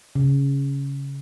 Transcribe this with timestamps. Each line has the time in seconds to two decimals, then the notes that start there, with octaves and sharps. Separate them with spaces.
0.15 C#3